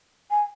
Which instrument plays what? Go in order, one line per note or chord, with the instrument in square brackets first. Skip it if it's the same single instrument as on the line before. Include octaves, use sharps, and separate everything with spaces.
[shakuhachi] G#5